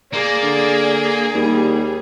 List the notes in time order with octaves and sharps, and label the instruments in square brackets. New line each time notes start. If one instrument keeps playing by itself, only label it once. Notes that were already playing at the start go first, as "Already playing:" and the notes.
[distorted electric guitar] A#3 [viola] G#4 [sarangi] D5
[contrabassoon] D3
[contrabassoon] D#2 [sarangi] G3